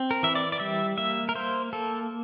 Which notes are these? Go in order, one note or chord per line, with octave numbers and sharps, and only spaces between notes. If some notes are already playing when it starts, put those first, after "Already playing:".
Already playing: C4
A#4
E3 E5
D5
D5
G3 E5
A#3 E5
A#4
A#3 C5
A#3 A4